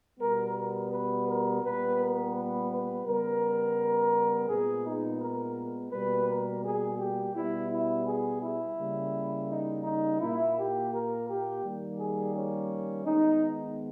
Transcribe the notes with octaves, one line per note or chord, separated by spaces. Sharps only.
B2 G3 B3 A#4
A#4
B4
A#4
A#2 G3 B3 B4
A#4
B4
B4
C#3 G3 B3 A#4
A#2 G#3 B3 G#4
D#4
A#4
B2 G3 A#3 B4
A#4
G#4
G4
B2 G3 B3 E4
E4
G#4
E4
C#3 G3 A#3
D#4
D#4
A#2 A#3 E4
G4
A#4
G4
D#3 G3 A#3
G#4
C#4
D#3 G#3 B3 D#4